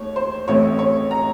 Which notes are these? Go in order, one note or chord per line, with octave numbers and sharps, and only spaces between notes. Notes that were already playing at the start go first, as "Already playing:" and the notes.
Already playing: D#2 A3 C#5
C5
A1 A2 A3 C4 C#5
C#5
A#5